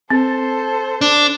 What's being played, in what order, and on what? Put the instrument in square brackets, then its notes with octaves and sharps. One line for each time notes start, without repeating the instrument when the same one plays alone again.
[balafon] C4 [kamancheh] A4 C5
[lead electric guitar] D4